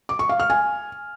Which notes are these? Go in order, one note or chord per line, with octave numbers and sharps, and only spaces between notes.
D6
C#6
F5
F6
G#5